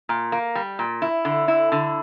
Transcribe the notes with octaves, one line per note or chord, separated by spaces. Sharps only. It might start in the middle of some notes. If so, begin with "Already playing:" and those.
A#2
A#3
G3
A#2
E4
D3
E4
D3